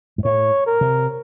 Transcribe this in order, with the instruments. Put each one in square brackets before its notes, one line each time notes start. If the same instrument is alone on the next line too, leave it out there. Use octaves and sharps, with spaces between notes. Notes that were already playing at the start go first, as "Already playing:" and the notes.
[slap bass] G#2
[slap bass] A2 [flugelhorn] C#5
[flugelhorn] A#4
[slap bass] C3